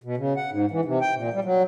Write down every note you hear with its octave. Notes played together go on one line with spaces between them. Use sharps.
B2
C#3
F#5
G#2
E3
C3
G5
A#2
G3
F#3